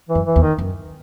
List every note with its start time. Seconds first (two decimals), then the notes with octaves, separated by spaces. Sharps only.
0.09 E3
0.15 F#2
0.26 E3
0.36 E2
0.42 D#3
0.58 F#2